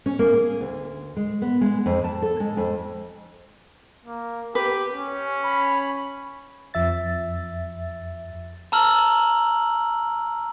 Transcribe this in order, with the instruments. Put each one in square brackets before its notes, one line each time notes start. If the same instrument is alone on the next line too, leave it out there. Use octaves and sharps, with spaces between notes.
[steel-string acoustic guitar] C#4
A#3
G#4
D2
G#3
B3
G#3
F2
A5
A4
G#3
F2
[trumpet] A#3
[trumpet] G4 [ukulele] B4
[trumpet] C#4
[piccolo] B5
[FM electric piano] F2 F3 E5 A6
[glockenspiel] A5 A#5 E6 F6 F#7